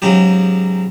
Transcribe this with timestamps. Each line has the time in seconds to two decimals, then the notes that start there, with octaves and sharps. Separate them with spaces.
0.02 G#2 C#3 F#3 G4